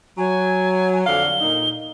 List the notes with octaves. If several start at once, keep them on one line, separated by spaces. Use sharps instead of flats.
F#3 G#5
F2 D3 F5 G7
A#2 D#4